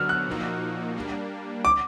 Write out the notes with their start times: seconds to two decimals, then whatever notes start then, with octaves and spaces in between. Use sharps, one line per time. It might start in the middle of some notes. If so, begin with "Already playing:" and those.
Already playing: D3 F#3 B3 D4 F#4 E6 F6
0.09 F#6
0.27 A#2 F3 A#3 D#4 F#4
0.96 G3 A#3 D4
1.65 D6